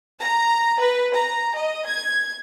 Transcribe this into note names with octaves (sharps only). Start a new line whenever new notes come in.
A#5
B4
A#5
D#5
G#6